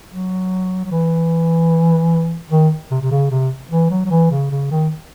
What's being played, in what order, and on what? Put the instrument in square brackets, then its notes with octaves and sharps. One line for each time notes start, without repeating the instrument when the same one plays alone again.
[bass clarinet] F#3
F#3
E3
D#3
C3
C3
C#3
C3
E3
F#3
F#3
E3
C#3
C#3
D#3